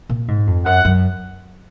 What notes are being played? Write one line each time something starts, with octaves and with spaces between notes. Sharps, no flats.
A#2
G#2
F2
F#2 F#5
F#2